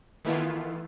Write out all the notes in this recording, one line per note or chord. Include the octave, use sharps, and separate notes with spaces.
D#3 E3 A3 B3 E4 F4